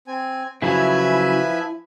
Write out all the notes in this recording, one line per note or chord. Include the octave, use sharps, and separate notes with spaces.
C4 G#5
C#3 F3 F#3 E4 B4 E5 G#5